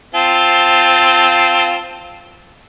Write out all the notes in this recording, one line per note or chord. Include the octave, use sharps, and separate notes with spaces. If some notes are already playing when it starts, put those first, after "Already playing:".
C4 F4 A5